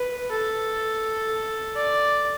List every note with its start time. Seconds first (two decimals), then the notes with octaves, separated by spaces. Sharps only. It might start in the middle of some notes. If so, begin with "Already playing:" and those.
Already playing: B4
0.31 A4
1.76 D5